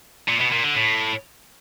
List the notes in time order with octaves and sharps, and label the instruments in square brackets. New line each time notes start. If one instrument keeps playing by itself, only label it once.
[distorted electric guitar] A#2
B2
A#2
D3
A2